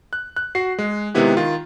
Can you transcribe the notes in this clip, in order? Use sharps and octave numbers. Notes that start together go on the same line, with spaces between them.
F#6
F#6
F#4 C7
G#3
C3 D#3 G#3 B3 E4 G4
D#3 F4